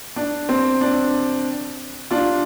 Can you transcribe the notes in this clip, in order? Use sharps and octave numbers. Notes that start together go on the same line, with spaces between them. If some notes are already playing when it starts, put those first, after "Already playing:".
D4
C4
D4
D4 F4